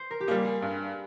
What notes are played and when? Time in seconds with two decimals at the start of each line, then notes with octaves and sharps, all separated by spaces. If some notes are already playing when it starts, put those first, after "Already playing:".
Already playing: C5
0.11 A#4
0.20 G4
0.27 G3 A#3 G#4
0.45 G#4
0.62 G2